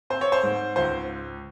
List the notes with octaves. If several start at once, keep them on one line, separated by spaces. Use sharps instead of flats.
C4 C5
C#5
C5
G#2
C#2 C5